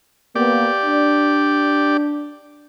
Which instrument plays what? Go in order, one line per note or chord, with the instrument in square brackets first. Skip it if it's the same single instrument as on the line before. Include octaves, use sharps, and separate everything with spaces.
[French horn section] A#3 B3 [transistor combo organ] G4 D5
[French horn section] D4